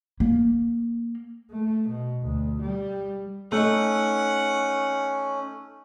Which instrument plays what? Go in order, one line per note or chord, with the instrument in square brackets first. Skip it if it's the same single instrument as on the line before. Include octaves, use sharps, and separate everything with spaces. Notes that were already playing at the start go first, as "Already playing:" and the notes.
[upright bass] A#3
[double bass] A3
B2
D2
G3
[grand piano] A3 D#4 [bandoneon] C#4 [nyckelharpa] F#5